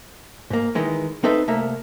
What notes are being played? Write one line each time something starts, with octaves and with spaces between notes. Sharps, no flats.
G#2 A#3
D#3 E3 G#3
C4 D#4 A4 B4 E5
C2 A3 A#3 E5 A#5